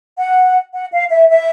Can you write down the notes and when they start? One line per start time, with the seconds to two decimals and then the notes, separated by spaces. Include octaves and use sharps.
0.18 F#5
0.73 F#5
0.92 F5
1.11 E5
1.29 E5